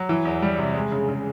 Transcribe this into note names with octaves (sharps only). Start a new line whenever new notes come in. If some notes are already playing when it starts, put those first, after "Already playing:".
Already playing: F#3
E3
E2
G3
C3
G#3
C#3
C#3